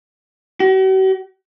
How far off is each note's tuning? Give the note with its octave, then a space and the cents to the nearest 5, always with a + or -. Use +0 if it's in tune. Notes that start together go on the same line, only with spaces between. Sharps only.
F#4 +45